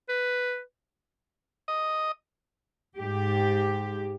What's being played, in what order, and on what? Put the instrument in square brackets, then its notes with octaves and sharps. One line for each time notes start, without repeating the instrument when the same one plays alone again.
[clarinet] B4
[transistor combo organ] D#5
[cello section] G#2 G4